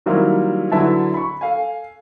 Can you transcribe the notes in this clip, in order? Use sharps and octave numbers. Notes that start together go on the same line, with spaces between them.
D#3 F#3 G3 A#3 C4 E4
D3 F#3 E4 B4 E5 A5
B5 C#6
A4 F5 G#5